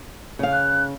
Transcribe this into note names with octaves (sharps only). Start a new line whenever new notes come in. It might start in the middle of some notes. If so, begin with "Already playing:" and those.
C#3 F5
F#6